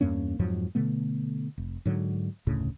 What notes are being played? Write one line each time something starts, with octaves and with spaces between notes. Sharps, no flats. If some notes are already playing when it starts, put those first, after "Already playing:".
E2 G2 A#3 C#4
F2 G#2 F3 F#3
B2 D3 A3 B3
F1
G#2 D3 F#3
F1 D2 A2 C#3